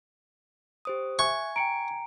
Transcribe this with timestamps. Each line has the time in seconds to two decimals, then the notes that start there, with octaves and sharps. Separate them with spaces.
0.85 G4 C5 D#6
1.19 E5 G#5 C#6 F#6 G#6
1.56 G5 A#5 C#7 D7